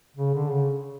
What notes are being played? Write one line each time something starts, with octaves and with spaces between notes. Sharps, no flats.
C#3
D3
C#3